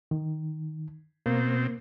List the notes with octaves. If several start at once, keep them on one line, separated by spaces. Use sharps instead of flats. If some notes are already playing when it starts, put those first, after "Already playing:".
D#3
B2 A#3 C4